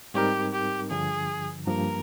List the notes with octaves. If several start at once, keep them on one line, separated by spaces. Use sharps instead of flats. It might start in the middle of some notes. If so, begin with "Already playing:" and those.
G#2 G3 C4 D#4 G4 A#4
G4
G2 D3 F3 G#4
G2 F3 A#3 A#4